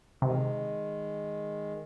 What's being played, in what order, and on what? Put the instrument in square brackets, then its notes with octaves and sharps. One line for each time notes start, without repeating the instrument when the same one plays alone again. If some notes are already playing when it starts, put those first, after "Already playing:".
[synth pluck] C3 [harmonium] D#3 G#3